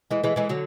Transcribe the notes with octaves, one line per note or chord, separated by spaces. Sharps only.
E3 G#3
E3 G#3
E3 G#3
D3 F#3